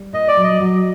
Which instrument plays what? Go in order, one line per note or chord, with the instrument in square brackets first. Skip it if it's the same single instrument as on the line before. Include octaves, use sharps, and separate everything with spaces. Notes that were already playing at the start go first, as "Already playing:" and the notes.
Already playing: [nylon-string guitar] G3
[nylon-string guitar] A#2 [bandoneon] D#5
[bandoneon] D5
[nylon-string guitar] F#3
[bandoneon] D#5
[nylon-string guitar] F#3